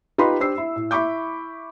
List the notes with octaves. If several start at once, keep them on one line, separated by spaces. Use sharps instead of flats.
D#4 F4 G4 B4 B5 C6
D4 G4 C5 E6 C7
E4
A2
E4 B5 C#6 D6 G6